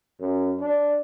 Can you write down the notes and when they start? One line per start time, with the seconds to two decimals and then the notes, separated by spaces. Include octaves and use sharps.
0.21 F#2
0.61 D4